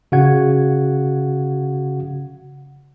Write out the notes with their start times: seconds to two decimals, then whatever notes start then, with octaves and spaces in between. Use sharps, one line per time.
0.12 C#3 F#4 F5 F#5 G#6